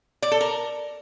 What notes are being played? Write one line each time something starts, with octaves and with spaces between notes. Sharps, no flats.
D5
A4
A#4